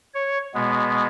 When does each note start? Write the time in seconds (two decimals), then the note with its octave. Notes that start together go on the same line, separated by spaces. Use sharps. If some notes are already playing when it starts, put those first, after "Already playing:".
0.14 C#5
0.54 B2 G#3 B3